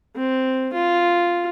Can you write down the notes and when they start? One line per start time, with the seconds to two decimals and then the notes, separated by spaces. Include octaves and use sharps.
0.16 C4
0.73 F4